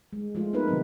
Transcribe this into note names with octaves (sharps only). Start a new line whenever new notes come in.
G#3
F3 G#3 A3 F4
A#3 B3 D#4 A#4 B4
C3 D#3 F#3 G3 C4